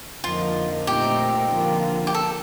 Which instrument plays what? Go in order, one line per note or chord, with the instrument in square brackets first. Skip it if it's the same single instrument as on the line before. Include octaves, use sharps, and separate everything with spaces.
[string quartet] F2 D3 F3 A#3 D#4 [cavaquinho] F4
[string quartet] A#2 A3 C4 D#4 A#4 [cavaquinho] G4
[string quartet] D3 F3 A#3 F4
[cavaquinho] G4
A4